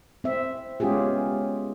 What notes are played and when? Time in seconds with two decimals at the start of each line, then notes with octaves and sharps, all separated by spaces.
0.24 C4 E5
0.80 G#3 B3 C#4 F4 G4 G#4